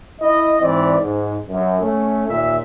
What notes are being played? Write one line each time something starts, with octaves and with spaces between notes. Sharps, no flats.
E4 D#5
G#2 E3 C4 D5
G#2
F#2
A3 C#4
D#2 A#2 E5